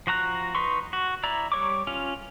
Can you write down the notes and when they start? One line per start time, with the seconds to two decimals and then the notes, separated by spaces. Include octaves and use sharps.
0.07 F3 F#4 A#5 F#6
0.55 D#4 B4 C6 C#6
0.93 F#4
1.24 E4 D5 A#5
1.52 G3 C#5 D6
1.87 C#4 F4